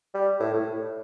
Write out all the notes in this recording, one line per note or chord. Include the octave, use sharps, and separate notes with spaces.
G3
A2
A2